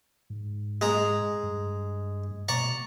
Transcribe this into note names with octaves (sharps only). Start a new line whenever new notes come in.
G#2
G#3 A#5
G2
B2 D5 A#5 C#6